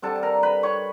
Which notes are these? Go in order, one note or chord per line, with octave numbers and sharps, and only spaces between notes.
D3 G3 C4 A4 A5
A5
A#4 A#5
B4 B5
C#5 C#6